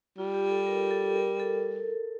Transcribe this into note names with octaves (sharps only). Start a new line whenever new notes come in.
G3 F4
G4
A4
A#4
A4
A#4
A4